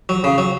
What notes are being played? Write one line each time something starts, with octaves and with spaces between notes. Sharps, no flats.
F#3
C#3
F#3